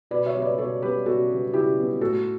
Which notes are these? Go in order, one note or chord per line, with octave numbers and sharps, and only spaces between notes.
B2 B4 D5
C#5 E5
G3 B3
B4 D5
B2 A4 C#5
G3 B3 G4 B4
B2 F#4 A4
G3 B3
B2 E4 G4
G3 B3
A2 F#4 A4